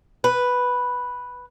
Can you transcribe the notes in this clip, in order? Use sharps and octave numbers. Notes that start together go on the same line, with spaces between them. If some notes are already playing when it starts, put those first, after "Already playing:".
B4